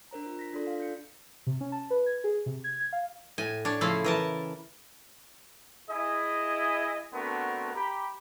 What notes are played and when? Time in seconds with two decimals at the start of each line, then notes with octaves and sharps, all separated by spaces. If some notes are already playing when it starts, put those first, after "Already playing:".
0.11 D4 A#4 C5 A#5
0.23 F4 C5
0.39 A#6 B6
0.53 D4 F4 A4 D5 C6
0.67 F5
0.80 G6 C#7
1.47 C3
1.61 C#4
1.72 A5
1.90 B4
2.06 G#6
2.24 G#4
2.46 C3
2.64 G#6
2.80 G#6
2.93 F5
3.38 A2 G#5
3.65 D4 C#5
3.81 C#3 F3 A3 E4 F5
4.04 E3 A#4 A5
5.89 E4 G#4 D#5
7.13 A3 B3 C4 D4 F#4 A#4
7.74 G4 A#5 B5